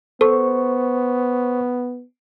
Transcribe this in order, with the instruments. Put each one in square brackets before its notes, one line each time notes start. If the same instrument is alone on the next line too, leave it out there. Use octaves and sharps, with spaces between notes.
[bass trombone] B3 [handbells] A4 [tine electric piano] C5 C#6